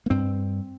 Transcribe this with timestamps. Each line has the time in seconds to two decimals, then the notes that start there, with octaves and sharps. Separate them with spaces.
0.06 A#3
0.10 G2 C4